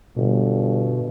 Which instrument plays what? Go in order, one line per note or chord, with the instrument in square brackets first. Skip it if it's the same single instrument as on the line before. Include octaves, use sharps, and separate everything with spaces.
[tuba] G1 [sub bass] B2